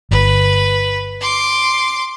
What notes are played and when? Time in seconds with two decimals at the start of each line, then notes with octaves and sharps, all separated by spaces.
0.11 G1 B4
1.20 C6 D6